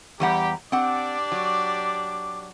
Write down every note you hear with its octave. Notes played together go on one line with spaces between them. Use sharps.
E2 G3 G4 F#5 A#5
C4 D4 G4 D5 F#5 D6
F#3